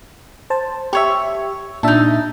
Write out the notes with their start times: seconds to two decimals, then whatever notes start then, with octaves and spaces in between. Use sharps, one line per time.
0.50 C5 A5
0.93 G4 C#5 E5 C#6
1.83 A#2 D4 D#4 E5 A5